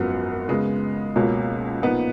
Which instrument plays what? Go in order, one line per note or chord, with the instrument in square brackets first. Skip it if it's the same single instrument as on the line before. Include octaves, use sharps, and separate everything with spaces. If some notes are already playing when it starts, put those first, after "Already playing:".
Already playing: [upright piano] G#1 F#2 F3 B3 F#4
C#3 G#3 B3
C#2 B2 A#3 C#4 F4
A#2 F3 B3 D#4